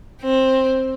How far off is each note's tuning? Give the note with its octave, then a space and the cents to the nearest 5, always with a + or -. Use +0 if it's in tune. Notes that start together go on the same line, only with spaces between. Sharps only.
C4 +15